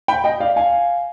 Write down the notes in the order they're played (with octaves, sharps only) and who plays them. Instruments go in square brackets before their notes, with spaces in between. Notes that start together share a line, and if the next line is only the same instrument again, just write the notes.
[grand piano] G5 B5
D#5 G5
D5 F5
F5 G#5